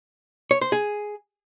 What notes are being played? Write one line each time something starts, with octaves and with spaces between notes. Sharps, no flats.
C#5
C5
G#4